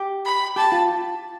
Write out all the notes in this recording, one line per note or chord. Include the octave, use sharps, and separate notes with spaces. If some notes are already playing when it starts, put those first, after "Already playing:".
Already playing: G4
B5
G4 A5
F4